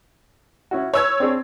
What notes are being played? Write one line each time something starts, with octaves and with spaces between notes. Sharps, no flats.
C#4 E4 F#4
B4 C#5 E6 G#6
C4 D4 G#4